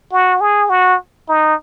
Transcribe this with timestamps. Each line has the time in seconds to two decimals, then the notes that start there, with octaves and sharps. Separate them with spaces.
0.12 F#4
0.41 G#4
0.70 F#4
1.28 D#4